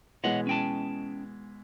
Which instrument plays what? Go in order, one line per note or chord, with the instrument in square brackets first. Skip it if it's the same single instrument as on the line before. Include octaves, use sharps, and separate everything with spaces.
[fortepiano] B2 E3 G#3 [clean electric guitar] C#5 D#5 F#5
[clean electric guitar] C#4 G5 A5